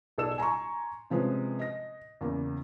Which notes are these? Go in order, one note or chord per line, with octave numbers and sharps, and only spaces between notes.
B1 G#4 A4 D5 E6 E7
G#5 A#5 C6 C#6
C3 F3 G#3 C#4 B4
D#5 A#6
E2 C#3 A#3